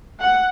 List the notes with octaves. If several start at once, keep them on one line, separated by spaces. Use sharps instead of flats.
F#5